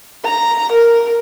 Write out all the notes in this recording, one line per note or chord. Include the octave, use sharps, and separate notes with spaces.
A#5
A#4